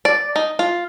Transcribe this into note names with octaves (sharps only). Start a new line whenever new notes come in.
D5
D#4
F4